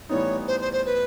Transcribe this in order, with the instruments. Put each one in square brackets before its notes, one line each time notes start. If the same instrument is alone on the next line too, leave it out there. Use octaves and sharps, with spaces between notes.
[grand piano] A2 E3 G3 B3 D#4 [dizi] C#5
[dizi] C5
C5
C5
B4